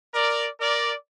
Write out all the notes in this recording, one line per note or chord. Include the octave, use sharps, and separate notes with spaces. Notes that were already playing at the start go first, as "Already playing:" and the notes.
A#4 D5
A#4 D5